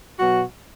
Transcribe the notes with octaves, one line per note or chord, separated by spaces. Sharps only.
B2 F#3 F#4